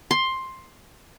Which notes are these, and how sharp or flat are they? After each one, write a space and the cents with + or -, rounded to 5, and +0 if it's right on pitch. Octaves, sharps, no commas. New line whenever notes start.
C6 +10